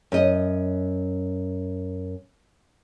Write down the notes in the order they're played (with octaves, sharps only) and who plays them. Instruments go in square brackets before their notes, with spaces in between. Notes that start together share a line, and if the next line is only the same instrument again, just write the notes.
[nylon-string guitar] F#2 D#5